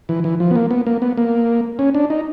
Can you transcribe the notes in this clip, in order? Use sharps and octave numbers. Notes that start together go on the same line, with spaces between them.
E3
E3
F3
B3
A#3
B3
A#3
B3
A#3
C#4
D4
D#4